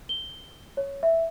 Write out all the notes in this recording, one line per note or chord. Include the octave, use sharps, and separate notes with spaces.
G7
C#5
E5